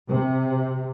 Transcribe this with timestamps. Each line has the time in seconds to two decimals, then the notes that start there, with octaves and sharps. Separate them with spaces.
0.10 C3